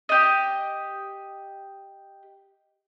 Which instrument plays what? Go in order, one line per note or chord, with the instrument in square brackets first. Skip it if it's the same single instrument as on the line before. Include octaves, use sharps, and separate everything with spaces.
[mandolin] G4 D#5